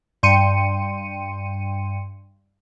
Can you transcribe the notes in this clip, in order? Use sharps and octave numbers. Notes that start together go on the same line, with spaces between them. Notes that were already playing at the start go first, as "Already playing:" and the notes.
G2 G5 C6 C#7 D#7